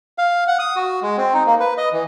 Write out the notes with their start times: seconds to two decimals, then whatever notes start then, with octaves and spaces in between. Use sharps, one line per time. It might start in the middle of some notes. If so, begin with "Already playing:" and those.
0.18 F5
0.48 F#5
0.59 D#6
0.76 F#4
1.02 G#3
1.18 C4
1.34 D#4
1.47 A#3
1.60 B4
1.78 D#5
1.93 E3